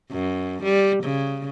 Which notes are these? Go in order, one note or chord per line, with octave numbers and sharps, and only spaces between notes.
F#2
G3
C#3